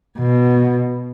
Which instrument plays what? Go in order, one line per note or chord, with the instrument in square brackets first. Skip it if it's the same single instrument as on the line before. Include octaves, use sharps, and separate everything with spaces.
[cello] B2